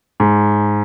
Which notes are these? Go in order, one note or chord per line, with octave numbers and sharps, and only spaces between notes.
G#2